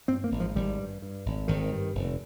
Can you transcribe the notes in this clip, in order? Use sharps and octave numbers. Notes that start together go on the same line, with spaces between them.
G2 C4
A#3
G#1
F3
G#1 G3
G2
G2
G#1
G#1 D#3
G2
F1